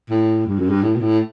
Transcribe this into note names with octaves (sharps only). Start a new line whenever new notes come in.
A2
G2
F#2
G2
A2
B2
A2